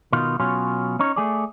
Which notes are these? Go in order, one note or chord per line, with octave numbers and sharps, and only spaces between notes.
B2 D#3 F4
B2 F#3 C#4 F4
C#4 D#4 C#5
A3 G#4 D5